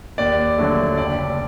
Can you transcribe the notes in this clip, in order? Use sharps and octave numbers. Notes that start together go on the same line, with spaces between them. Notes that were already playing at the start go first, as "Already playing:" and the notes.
D#2 D5
D3 F#3 A3
F#1 D5